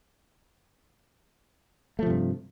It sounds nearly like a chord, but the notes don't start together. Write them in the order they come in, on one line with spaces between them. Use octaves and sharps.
A3 F3 C3 G2